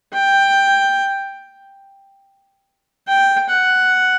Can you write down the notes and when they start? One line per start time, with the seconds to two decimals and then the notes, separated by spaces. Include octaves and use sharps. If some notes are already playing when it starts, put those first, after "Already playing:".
0.13 G5
3.08 G5
3.49 F#5